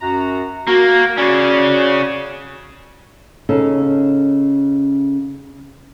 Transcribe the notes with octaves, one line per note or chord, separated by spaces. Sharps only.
F#2 F#4 A#5
A#3 F#4
C#3 C#4 F#4 D5
C#3 C#4 D#4 A4